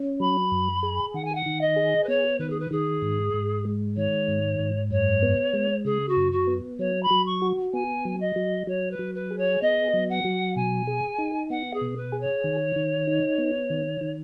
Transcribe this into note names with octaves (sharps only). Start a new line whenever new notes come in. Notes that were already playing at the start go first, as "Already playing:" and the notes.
Already playing: C#4
F#3 B5
F#2
G#4
D#3 F#5
G#5
F#5
D#3
D#5
G#4
B4
B3 C#5
D#3 B4
G#4
B4
D#3 G#4
G#2
G#2
G#3
D#3 C#5
G#2
G#2
F#2 C#5
B3
G#3
C#3 G#4
F#4
F#2
F#4
B3
F#3 C#5
B5
F#3
C#6
F#4
B3 G#5
F#3
D#5
F#3
F#3 C#5
B4
F#3
B4
G#4
C#5
B3 D#5
F#3
F#5
F#3
B2 G#5
G#4
D#4
B3 F#5
G#4
B2
B4
G#4
C#5
D#3
D#3
D#4
B3
D#3
D#3